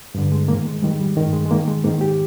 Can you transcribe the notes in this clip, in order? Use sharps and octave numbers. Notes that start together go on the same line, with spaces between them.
G2 D3
G#3
G#2 D#3 A#3
G#3
G#2 D#3 G3
G#3
G3
G2 D#3 G#3
G#3
G#3
G#2 D#3 A#3
G#3
G#2 D#3 A#3
G4